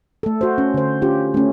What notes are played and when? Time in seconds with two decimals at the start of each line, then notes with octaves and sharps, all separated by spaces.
0.23 A3 A4
0.41 F#4 C5
0.58 C#4
0.74 D3 C5
1.02 C#4 F4 G4
1.34 A3 C#4